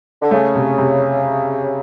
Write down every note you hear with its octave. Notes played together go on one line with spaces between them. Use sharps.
D3
C#3 A3
C3
C3